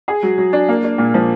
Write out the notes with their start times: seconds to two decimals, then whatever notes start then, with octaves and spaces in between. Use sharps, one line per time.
0.08 G#4
0.23 F#3
0.38 F#3
0.53 D4
0.69 A#3
0.84 D4
0.98 A#2
1.14 F3